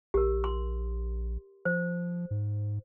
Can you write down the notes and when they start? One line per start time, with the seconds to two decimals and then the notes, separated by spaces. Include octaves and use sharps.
0.14 A#1 G4 A#4
0.44 C6
1.65 F3 C5
2.31 G#2